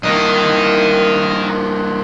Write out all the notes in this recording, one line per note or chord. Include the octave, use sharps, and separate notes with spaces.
G2 A#3 A#4 D#5